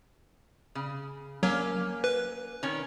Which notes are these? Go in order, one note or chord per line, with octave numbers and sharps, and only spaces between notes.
C#3
F#3 A#3 C#4
B4
D#3 C#4